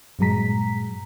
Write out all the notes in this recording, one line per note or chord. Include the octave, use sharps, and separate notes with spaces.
G2 A#2 F#3 G#3 A#5 B6